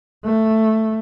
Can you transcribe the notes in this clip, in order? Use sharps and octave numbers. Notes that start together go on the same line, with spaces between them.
A3